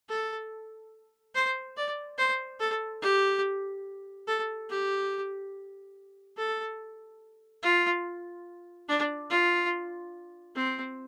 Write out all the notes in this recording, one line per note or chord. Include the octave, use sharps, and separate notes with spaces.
A4
C5
D5
C5
A4
G4
A4
G4
A4
F4
D4
F4
C4